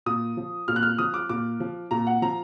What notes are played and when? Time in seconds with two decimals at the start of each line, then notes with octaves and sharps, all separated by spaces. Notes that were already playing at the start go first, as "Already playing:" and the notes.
0.06 A#2 D#6
0.37 F3
0.68 A#2 F6
0.76 F#6
0.83 F6
0.99 F3 D#6
1.14 D6
1.29 A#2 D6
1.60 F3
1.91 A#2 A#5
2.07 F#5
2.22 F3 A#5